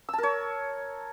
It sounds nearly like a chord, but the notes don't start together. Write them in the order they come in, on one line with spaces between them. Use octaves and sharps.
E6 A5 A#4 C#5